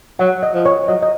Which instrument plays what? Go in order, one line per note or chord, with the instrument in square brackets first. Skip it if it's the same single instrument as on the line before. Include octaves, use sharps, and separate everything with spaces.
[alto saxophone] F#3 [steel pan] F#5
[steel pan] D#5
[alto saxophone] F3
[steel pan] C#5
[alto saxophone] F#3 [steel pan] D#5
[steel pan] D#5